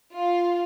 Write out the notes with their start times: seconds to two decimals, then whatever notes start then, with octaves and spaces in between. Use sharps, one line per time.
0.14 F4